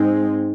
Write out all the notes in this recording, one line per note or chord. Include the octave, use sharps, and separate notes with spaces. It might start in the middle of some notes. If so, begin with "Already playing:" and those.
Already playing: G#2 G#3 C4 D#4